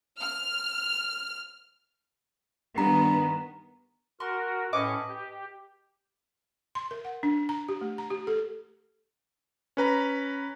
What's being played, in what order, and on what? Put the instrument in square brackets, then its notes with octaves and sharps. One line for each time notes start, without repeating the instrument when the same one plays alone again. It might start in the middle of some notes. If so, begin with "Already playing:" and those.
[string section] F6
[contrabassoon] G2 [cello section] D#3 B3 [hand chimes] A#5
[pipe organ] F#4 A#4 [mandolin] C6 C#6
[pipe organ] A2 C#4 C#6 [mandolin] B4 D#5 D6
[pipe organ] G4
[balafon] C6
A#4
F#5
D4
A#5
G4
A3
A#5
G4
A4
[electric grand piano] C#4 B4 A#5